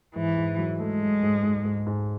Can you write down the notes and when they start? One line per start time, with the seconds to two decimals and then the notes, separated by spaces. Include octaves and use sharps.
0.15 G#2 E3
0.38 G#2
0.59 F#3
0.80 G#3 A3
1.02 F#3
1.23 G#2
1.43 G#2
1.64 G#2
1.87 G#2